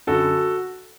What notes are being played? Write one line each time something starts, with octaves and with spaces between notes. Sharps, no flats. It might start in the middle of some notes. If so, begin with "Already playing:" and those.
F#2 D3 F#4 A4